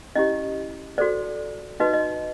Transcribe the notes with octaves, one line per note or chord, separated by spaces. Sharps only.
C#4 E4 G4 D#5
F#4 A4 C5 D5
D#4 F#4 B4 D#5
D#5